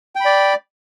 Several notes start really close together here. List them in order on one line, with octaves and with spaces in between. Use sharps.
G5 B5 D5